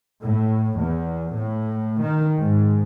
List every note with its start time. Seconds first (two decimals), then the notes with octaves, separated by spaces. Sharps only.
0.22 A2
0.79 E2
1.33 A2
2.00 D#3
2.38 G#2